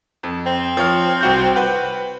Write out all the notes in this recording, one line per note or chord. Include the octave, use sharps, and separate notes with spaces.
F2
C4
F3 C#5 F6
C2 F#4 G6
B4 F#5 G5